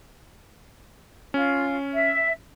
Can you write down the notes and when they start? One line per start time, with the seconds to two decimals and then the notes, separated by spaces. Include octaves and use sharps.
1.34 C#4 F4
1.92 E5